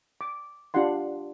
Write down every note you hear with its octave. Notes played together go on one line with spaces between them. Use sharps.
D6
D4 F4 G4 F#5 C6